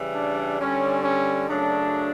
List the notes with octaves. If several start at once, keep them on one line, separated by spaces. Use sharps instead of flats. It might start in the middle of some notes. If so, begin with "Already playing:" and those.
Already playing: C#3 E3 G3
D4
G2 D3 G3 C#4
C#4
F#2 C#3 F#3 A3 D4